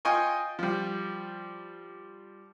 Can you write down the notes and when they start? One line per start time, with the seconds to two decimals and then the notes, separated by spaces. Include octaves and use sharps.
0.05 F4 D#5 G5 G#5 C#6
0.59 F3 G3